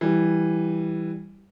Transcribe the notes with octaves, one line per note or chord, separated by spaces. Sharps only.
E3 G3